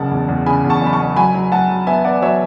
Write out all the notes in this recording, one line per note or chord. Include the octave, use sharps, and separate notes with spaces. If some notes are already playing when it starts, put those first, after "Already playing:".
Already playing: F#1 C#3 F#5 A5
E2
E2
C#3 G#5 B5
E2
A5 C#6
F#1
B5
A5 C#6
F#1
F#3 G#5 B5
F#3
F#3 F#5 A5
F#3
B3 E5 G#5
B3 D5 F#5
F#3 C#5 E5